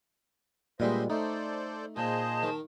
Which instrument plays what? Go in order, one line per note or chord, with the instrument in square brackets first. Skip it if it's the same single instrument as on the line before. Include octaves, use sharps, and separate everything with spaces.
[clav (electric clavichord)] A#2 G3 G#3 [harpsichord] B3 D4 [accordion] C5 D#5 E5
[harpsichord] A3 [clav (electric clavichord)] D#4 [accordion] A4 C5 D5
[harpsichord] A#2 [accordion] G#4 C5 D#5 [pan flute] A5
[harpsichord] D#3